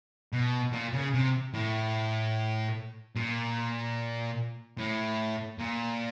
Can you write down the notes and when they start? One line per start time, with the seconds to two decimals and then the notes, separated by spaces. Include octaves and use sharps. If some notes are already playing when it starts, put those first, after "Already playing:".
0.33 B2
0.73 A#2
0.93 C#3
1.14 C3
1.54 A2
3.15 A#2
4.78 A2
5.58 A#2